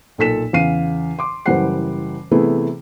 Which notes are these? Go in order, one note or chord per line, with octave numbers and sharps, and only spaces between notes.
B1 A#2 A4 B6 E7
E2 C#3 F5 C7 D#7
C6 D6
F#1 E3 G3 C5 F#5 C7
C3 E3 A3 B3 E4 G#4